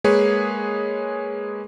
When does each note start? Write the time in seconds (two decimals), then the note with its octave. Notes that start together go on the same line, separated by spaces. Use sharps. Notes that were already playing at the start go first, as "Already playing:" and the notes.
0.04 G#3 A#3 G#4 B4 C#5